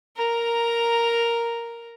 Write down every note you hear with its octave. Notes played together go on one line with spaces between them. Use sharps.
A#4 A#5